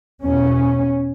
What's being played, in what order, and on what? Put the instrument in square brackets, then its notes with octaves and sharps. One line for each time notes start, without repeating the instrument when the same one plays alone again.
[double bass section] E2 B2 C#4